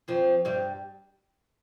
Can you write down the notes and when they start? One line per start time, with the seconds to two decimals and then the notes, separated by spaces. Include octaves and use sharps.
0.08 F2 F3
0.45 G2 G3